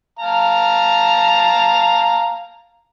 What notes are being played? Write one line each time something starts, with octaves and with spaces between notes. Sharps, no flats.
F5 A5 A#5